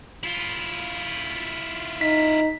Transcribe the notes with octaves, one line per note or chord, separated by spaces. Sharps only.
E4 F4
D#4 B6